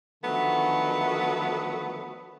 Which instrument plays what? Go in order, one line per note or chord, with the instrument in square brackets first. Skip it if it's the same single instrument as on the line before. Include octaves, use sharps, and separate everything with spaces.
[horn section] D3 D#3 F3 F#3 A3 B3